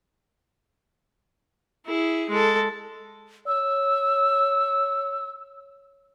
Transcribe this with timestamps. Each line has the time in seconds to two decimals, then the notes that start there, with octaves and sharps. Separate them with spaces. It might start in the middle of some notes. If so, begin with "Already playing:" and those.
1.86 E4 G#4
2.30 G#3 A4
3.47 C#5 E6